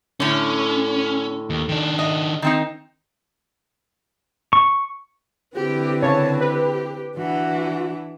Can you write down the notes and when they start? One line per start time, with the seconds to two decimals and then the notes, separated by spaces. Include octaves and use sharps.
0.20 A2 D3 C#4
1.50 D#2
1.69 D#3 D4
1.99 D#5
2.42 D#3 C4 D#4
4.53 C#6
5.56 D3 E3 C4 G4
6.02 C#3 C#5 A5
6.41 G4 B4
7.18 E3 D4 F#4